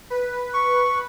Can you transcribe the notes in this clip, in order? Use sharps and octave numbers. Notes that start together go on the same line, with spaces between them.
B4
C#6